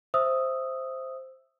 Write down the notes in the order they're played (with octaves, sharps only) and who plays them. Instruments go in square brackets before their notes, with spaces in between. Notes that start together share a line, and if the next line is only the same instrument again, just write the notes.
[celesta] C5 E5 D#6 E6